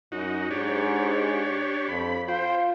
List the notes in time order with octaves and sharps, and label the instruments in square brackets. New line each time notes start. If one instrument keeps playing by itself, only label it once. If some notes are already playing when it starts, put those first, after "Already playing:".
[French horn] F#2 [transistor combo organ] D#4 F#4
[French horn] G#2 [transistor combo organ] D4 G4 C#5
[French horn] F2 [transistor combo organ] B5
[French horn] F4 [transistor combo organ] C5 G5